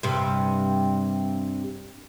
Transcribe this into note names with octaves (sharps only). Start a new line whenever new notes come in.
G2 C3